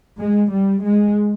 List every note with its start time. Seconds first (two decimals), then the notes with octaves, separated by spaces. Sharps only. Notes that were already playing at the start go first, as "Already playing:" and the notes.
0.18 G#3
0.50 G3
0.82 G#3